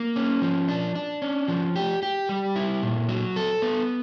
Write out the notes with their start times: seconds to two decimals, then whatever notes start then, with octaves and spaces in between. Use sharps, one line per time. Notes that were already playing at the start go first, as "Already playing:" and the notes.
Already playing: A#3
0.16 C#4
0.42 F3
0.68 D4
0.95 D4
1.22 C#4
1.48 F3
1.76 G4
2.03 G4
2.29 G3
2.56 E4
2.82 A#2
3.09 F#3
3.36 A4
3.62 B3